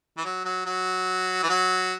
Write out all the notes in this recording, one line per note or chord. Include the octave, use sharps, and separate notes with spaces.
E3
F#3
F#3
F#3
E3
F#3